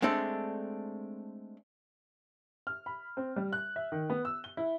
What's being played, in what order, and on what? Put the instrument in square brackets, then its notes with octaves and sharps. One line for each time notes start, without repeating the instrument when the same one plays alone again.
[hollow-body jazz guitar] G#3 A3 C4 D4 A4
[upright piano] F6
B5
C4
G3
F#6
E5
D#3
B3
E6
G7
E4